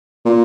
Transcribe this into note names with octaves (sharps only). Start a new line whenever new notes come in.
A#2